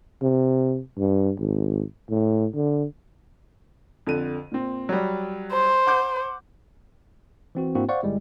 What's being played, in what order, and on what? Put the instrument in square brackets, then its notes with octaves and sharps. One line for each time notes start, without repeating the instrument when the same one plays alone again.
[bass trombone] C3
G2
G#1
A2
D3
[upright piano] F2 D3 D#7
A#2 C4
F#3 G3
[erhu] C5
[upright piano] F#5 D6 G6
[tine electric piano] E3 C4 F#4
G#2 A#3 C4 D4 E4 F#4
C5 D5 F5 F#5 C#6
G1 G3 G#3 E4